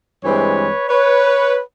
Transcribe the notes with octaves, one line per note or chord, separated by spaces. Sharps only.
G2 E3 G#3 C4 B4 C#5
B4 C#5